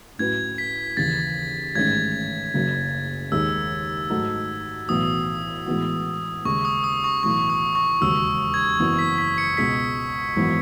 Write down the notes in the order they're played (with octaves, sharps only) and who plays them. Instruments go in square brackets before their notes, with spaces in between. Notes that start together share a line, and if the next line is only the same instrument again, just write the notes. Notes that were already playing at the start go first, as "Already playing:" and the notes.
[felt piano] A2 F#3 C#4 F#4 B4 [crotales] G#6
[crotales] B6
[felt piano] D#2 C#3 E3 [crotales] A6
[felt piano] A1 G#2 D#3 G#3 C#4 [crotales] G#6
[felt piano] F#1 F#2 C#3
[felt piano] D#2 D#3 G#3 [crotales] E6
[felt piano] G#2 F#3 A3 D#4
[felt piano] B1 A2 E3 B3 F#4 [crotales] D#6
[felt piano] A2 E3 G#3 B3 F#4
[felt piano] D#2 C#3 G#3 [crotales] C#6
[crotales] D#6
D#6
C#6
[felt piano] B1 A2 E3 A3 [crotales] C#6
[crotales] D#6
C#6
[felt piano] E1 D#2 C#3 F#3 [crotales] E6
[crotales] G#6
[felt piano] F#1 F#2 E3 B3 E4
[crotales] B6
B6
C#7
[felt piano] C#2 B2 G#3 [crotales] B6
[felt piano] G#1 F#2 E3 B3